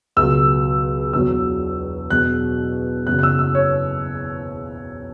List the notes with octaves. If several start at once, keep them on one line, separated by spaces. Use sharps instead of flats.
C#2 B2 F#3 E6
E1 E2 B2 F#3 E6
E1 E2 B2 F#3 F#6
F#1 E2 C#3 F#3 F#6
F#6
E6
E6
C#5